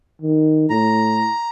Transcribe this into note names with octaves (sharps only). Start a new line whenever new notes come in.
D#3
A2 A#5